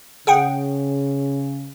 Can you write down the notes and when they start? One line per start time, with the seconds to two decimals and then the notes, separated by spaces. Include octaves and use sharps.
0.27 C#3 G#4 F#5 G5